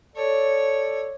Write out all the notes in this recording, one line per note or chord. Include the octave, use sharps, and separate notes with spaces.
A4 C#5 D5